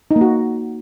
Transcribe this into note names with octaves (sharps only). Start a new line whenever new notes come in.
D#4
A#3
F#4